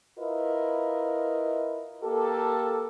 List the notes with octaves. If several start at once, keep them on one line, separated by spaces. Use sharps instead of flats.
E4 F4 A#4 B4 D#5
A#3 G4 A4